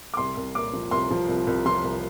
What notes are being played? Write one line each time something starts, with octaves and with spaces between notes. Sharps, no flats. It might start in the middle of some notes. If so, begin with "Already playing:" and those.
D6
C2 C6
C2
A#2 D6
F3
C2 C6
F3
C2
C2
F3 C6
C2